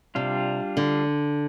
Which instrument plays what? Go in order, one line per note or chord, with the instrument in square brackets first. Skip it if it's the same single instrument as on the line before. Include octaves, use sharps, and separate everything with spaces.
[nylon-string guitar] C3 [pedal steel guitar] G3 D4 F4
[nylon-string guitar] D3